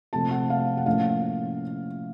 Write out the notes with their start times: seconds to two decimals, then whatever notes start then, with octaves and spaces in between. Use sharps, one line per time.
0.13 C3 F3 A3 C4 A5
0.31 F#5
0.50 F5
0.77 F#5
0.86 A2 F3 A#3 C#4 F5